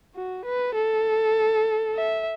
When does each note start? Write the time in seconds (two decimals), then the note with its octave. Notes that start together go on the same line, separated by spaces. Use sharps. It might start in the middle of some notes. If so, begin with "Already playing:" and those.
0.15 F#4
0.45 B4
0.75 A4
1.95 E5